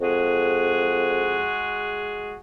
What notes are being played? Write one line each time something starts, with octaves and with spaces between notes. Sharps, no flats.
F2 G#3 F#4 G#4